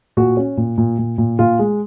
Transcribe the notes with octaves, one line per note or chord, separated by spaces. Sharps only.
A#2 F#4
C#4
A#2
A#2
A#2
A#2
A#2 F4
G#3